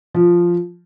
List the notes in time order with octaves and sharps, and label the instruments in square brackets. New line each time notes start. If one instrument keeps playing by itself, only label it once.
[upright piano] F3